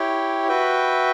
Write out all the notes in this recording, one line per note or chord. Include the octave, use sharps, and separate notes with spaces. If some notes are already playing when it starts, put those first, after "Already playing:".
Already playing: E4 G4 C#5 G5
F#4 B4 E5 G5